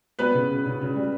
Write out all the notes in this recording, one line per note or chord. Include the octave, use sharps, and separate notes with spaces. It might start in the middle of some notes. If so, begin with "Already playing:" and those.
G3 B3 B4
C#3
C#3
C#3
C#3
G3